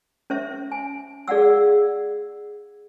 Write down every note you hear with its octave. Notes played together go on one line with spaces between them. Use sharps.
C#4 C5 E5
G#5
G#4 D5 F5 F#5 E6